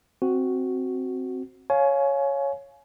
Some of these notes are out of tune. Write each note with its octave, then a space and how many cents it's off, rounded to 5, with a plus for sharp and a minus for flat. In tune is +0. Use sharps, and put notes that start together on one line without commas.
C4 +0 F#4 +0
C#5 +0 F5 +0 G#5 +25